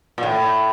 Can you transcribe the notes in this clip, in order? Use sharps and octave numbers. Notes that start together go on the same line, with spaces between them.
A#2
A2